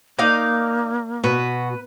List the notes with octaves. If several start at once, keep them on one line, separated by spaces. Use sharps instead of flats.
A#3 D#4 D5 F5
B2 F#4 B4